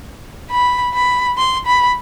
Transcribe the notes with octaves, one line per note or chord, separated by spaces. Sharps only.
B5
B5
C6
B5